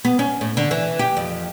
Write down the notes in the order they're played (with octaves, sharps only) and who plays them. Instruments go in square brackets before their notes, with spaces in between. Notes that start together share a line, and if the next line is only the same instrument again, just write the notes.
[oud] B3
C#4
A2
D3
E3
G4
F2